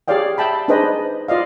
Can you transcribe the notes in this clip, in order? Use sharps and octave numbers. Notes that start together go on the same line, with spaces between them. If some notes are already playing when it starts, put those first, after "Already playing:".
G4 G#4 C#5 D5 F5 G5
E5 G5 A5 B5
D4 D#4 G#4 B4 C5 D#5
F4 D5 D#5 F5